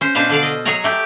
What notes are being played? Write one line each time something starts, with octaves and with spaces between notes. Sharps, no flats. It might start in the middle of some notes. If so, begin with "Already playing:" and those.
C#4 C5
B2 D4 B4 C5 F5
D3 A4 D5 F5
D#5
F#3 G#4 C#5 G#5 A#5
A3 G4